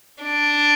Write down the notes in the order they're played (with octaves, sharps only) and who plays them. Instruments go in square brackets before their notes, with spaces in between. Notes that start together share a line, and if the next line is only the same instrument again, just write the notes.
[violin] D4